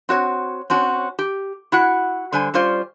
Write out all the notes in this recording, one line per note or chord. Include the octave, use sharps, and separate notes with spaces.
C4 F#4 C#5
C4 C#4 F#4 C#5
G4
E4 F#4 F#5
D3 G3 C5 G#5
G3 C#4 F4 C5 D5